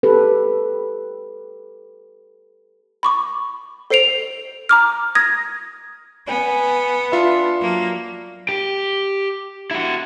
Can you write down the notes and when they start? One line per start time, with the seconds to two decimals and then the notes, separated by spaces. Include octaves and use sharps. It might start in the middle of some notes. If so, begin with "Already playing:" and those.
0.03 G4 A4 B4
3.03 B5 C#6 D6
3.90 A4 C5 C7 D7 F7
4.69 A#5 D6 F6
5.15 D#6 G#6 A#6
6.27 B3 G#5
7.12 D4 F4 E5
7.60 F#3 A#3
8.49 G4
9.71 E4 F#4